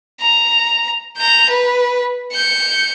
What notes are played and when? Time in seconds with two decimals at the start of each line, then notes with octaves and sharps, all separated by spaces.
0.21 A#5
1.17 A#5 G6
1.50 B4
2.33 G6 C#7